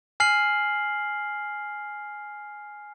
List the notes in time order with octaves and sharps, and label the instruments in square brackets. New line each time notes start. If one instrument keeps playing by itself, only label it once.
[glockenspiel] G#5 F6 C7 F#7